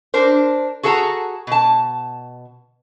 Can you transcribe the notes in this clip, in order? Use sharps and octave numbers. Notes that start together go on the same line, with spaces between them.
D4 A#4 C5
F#4 G#4 A4 F#5 A#5
B2 A5